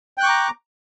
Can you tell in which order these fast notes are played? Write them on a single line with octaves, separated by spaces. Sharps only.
G5 F#6 C#6 D6 A#5